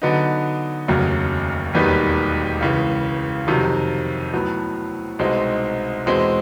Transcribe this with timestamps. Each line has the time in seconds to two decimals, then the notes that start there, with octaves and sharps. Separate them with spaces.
0.02 D3 F#3 B3 D#4
0.88 F1 D#2 C#3 F#3
1.74 E1 D#2 D#3 G3 B3
2.61 C#2 C#3 E3
3.47 F2 C3 D#3 F#3
4.34 A2 F#3 B3
5.19 C2 B2 G#3 C4 D#4
6.06 E2 B2 G#3 C4